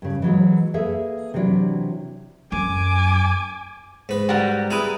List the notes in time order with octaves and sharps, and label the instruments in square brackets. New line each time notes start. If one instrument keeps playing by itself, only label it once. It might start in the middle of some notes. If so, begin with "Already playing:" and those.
[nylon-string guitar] G2 C#3
E3 F#3 G#3
A#3 G#4 A4 B4 E5
C3 E3 F#3 D4 E4
[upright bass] F#2 [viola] G#5 D6
[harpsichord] G#2 B4
[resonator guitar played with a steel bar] G3 [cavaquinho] F#4 A#4 F#5
[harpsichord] E4 G#4 D#6 [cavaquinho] A#4 B4